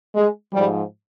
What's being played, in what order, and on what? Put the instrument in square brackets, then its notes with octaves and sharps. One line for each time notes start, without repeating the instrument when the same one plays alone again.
[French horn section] G#3
G#2 F3 G3